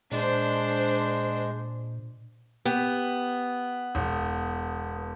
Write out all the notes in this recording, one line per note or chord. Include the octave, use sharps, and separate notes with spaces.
A#2 G#3 D4 C5
B3 G4
E1